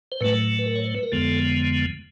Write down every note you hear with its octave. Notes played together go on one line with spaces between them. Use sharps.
C5
A2 F#3 A3 B4
B4
A#4
C#5
C5
B4
A#4
F2 D3 F3 G#3 B3 A4